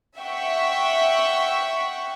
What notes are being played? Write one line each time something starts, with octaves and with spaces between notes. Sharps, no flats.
E5 F#5 G5 C#6